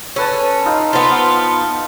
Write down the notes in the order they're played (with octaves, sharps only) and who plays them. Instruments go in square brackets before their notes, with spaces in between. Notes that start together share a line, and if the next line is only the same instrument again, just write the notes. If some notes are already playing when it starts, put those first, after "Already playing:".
[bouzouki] C#4 [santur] A4 B4 A5
[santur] D#4 F4
[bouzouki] B3 F4 [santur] C5 A5